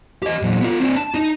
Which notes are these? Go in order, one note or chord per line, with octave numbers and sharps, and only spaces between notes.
G4 D#5
A#2 F#3
B3 F4
C4 D4
A5
D#4 D#5